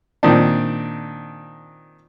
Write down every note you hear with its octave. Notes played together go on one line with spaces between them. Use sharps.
A#2 D#3 C4 D4